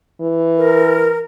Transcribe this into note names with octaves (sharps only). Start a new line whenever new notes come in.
E3
A#4